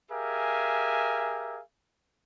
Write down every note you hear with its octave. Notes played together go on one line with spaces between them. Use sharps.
G4 G#4 A#4 E5 F5 G#5